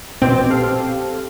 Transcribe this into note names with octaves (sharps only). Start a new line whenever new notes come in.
A#1 B2 C4 D6
G4 A4 F5